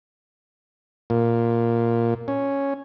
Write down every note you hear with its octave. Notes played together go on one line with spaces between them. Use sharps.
A#2
C#4